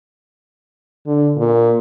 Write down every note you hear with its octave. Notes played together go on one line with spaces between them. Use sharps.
D3
A#2